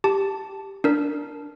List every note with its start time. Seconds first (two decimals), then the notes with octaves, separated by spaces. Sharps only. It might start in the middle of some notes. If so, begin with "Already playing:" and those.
0.04 G4 A5
0.84 D4 A#4